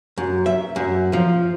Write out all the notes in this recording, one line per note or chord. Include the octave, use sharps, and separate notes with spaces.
F#2
E5
F#2
F3